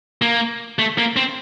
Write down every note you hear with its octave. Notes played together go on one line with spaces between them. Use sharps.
A#3
A3
A#3
C4